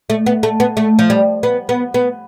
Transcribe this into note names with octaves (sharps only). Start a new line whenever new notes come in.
A3
B3
A3
B3
A3
F3
G3
B3
B3
B3